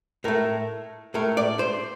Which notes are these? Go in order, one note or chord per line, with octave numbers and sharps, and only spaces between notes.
A2 A3 A#4
A2 A3 A#4
D5
C5